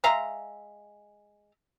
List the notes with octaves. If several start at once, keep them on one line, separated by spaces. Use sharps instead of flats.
G#3 E5 F5 A#5